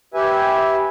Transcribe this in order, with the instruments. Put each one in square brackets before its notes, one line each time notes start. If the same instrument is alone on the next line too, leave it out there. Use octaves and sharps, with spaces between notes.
[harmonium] G4 B4 E5 G#5